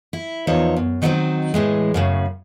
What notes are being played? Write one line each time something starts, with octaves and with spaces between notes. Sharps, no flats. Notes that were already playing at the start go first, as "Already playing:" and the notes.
E4
E2 F3 D#4 C#5
F#2
D#3 F#3 G3 B3 C4 D#4
A2 E3 G#3
F#2 A2 C#3